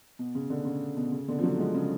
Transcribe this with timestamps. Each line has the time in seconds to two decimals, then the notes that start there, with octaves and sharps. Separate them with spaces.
0.19 B2
0.35 C#3
0.50 B2 D3
0.65 C#3
0.97 B2
1.12 C#3
1.28 B2 D3
1.39 F3
1.43 D3 F#3
1.58 F3 G#3
1.74 C#3